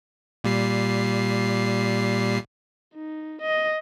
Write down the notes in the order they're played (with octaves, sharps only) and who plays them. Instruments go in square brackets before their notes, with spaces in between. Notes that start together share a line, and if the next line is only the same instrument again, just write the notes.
[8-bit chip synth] A#2 G3 C7
[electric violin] D#4
D#5